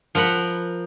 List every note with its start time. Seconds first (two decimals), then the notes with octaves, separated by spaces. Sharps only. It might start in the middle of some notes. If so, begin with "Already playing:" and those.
0.15 F3 A#4 F#5 B5